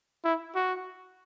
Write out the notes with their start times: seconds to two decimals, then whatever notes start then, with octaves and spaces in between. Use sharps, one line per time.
0.24 E4
0.55 F#4